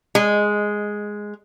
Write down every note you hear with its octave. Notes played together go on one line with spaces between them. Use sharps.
G#3